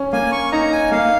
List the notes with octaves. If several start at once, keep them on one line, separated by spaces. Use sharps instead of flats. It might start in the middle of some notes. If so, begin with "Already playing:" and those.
Already playing: C#4
A#3 G#5
C#6
D#4 A#5
G#5
A#3 F5